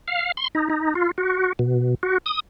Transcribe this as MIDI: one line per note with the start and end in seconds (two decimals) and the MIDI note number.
0.08 0.32 77
0.37 0.48 84
0.55 0.69 63
0.70 0.94 63
0.95 1.11 65
1.18 1.53 66
1.59 1.95 47
2.03 2.18 66
2.26 2.40 87